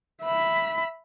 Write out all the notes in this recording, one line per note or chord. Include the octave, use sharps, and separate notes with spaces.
E5 B5